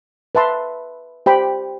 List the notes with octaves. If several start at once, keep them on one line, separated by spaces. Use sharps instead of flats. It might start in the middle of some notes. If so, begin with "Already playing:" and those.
B4 E5 A5 C6
G4 C5 G5 B5